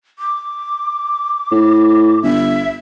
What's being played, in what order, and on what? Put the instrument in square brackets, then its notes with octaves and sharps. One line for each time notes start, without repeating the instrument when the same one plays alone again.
[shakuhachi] D6
[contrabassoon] A2
[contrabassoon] G1 [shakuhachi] E5